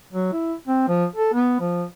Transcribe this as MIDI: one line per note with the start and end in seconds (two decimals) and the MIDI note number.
0.13 0.30 54
0.32 0.54 64
0.68 0.83 60
0.88 1.06 53
1.15 1.33 69
1.33 1.56 59
1.60 1.84 53